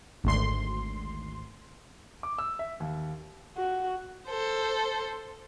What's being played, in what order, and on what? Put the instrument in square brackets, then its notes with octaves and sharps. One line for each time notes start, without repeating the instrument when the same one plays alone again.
[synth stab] G#1 D2 C6
[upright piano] D6
E6
E5
D#2
[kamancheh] F#4
[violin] A4 C5